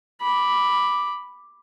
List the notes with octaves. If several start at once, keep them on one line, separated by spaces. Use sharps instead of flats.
B5 D6